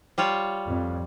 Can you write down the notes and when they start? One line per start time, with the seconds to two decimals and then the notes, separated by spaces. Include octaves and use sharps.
0.18 G3 F4 C#5
0.66 F2